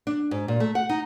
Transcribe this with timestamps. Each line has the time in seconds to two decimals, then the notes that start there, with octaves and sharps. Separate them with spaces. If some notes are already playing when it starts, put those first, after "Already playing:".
0.07 D4
0.31 G#2
0.48 A#2
0.60 A3
0.75 F#5
0.89 D#4